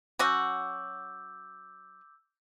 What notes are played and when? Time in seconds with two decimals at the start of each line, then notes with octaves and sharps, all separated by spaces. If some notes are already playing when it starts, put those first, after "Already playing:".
0.19 F#3 C#4 F#4 D6 E6 G6